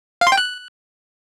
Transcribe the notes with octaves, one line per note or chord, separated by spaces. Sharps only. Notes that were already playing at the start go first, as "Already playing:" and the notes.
F5
C6
G5
F#6